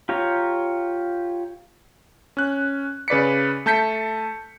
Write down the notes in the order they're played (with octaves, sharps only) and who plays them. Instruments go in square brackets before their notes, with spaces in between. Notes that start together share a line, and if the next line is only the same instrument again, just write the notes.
[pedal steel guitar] F4 G4 C#5 A#5
[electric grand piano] C#4 F#6
C#3 B4 D5 B6 C#7
A3 A5 G6 B6 C#7